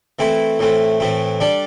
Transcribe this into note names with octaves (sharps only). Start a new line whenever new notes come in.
E3 A3 C4 E4
A2 E3 A3 C4
A2 E3 A3 C4
G3 D4 A4 D5